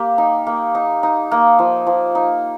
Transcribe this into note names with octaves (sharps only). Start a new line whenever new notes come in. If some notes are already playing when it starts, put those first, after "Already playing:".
Already playing: A#3 G4
D#4
A#3
D#4
D#4
A#3
F3
F3
D#4